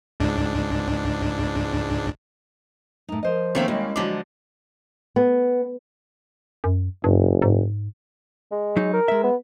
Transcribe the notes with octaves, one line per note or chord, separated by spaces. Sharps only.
C#2 G#2 D4
A2 D#4
F3 A#4 C5 D#5
D#3 A3 A#3 C4 C#4
D#2 G3 G#3 E4
D3 F3 F#3 D4 D6
B3
F#2
F#1 G2
G#2
G#3
F#3 D#4
A#4
G#3 E5
B3